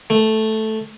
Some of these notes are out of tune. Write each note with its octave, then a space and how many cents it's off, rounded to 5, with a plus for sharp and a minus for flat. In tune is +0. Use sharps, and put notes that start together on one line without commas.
A3 -5